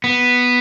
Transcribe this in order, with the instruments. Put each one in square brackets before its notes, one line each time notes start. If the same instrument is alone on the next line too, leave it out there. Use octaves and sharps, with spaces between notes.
[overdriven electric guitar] B3